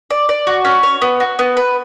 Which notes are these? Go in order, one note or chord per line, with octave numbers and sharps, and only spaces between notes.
D5
D5
F#4
C#4
C#5
B3
F#4
B3
B4